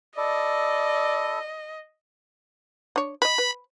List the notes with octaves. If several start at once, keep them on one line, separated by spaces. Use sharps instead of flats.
E4 A4 D5 D#5
D4 C#5
B4 D#5 B5
B4